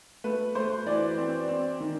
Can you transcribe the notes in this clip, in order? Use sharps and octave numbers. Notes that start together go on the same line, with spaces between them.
A3 B4
A3 C5
E3 D5
C4
C4
D#3